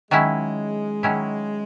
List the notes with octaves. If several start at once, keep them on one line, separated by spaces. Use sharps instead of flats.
D#3 F#3 G#3 C#4 E4
D#3 F#3 C#4 E4